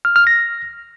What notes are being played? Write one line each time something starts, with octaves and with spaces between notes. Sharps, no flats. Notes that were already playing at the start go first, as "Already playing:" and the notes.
F6
F6
A#6